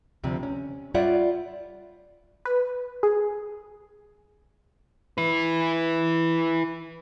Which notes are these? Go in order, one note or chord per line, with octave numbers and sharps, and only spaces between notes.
D2 C3 F3
C#4
G3 F4 C#5 D5 E5 F#5
B4
G#4
E4 B4